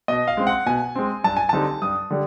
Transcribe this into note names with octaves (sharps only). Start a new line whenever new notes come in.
B2 D#5
F5
G#3 C4
F#5
B2 G#5
G#3 C4
G2 A5
G#5
D3 G3 C4 D#4 A5
G2 D#6
D3 G3